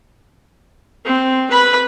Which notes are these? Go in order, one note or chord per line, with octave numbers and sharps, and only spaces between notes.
C4
B4 B5